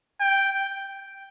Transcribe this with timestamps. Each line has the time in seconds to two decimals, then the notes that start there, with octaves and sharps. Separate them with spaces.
0.21 G5